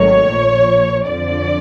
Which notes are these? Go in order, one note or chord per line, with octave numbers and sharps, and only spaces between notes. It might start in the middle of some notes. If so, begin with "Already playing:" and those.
Already playing: G#1 G#2 D#3 F#3 A3 C#5
A#1 A#2 F3
F2 D3 F3 D5